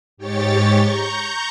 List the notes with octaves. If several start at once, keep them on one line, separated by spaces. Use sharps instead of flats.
G#2 G4 C#5 C#6 A6
A#5 C#6 G6